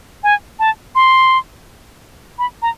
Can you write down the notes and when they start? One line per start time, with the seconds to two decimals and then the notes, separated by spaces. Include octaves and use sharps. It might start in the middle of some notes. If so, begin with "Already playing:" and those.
0.24 G#5
0.59 A5
0.95 C6
2.39 B5
2.62 A#5